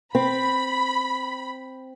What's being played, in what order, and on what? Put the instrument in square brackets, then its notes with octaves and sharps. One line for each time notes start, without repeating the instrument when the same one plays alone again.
[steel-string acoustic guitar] C4 [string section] B5